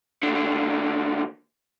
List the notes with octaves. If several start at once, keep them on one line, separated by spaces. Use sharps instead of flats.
D#2 D3